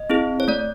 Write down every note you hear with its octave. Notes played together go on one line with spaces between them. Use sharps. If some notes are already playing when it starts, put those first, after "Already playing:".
Already playing: D#5
C4 E4 G#4
C#5
A3 D5